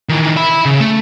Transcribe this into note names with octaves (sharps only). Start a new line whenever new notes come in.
D#3 E3
E5 B5
C#3
A3